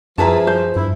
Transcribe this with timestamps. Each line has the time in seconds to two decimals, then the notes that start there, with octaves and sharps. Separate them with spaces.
0.18 F#2 F3 E4 G#4 B4 A5 A#5
0.47 C5
0.76 G2 E4